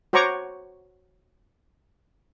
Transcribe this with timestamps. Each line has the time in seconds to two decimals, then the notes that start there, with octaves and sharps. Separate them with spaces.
0.13 F#4 C5 C#5 A#5 C#6 D6